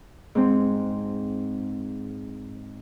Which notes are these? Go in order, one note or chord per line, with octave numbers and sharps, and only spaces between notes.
G#2 C4